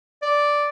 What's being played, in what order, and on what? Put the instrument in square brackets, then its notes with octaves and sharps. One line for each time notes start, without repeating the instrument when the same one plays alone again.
[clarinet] D5